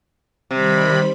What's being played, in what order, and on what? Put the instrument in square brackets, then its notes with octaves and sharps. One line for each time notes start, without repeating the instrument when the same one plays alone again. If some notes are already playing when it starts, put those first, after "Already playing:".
[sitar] C3 [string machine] D#3 G3 B5